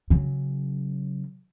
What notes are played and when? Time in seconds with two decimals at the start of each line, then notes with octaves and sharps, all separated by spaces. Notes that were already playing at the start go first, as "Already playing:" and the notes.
0.10 C#3 F#3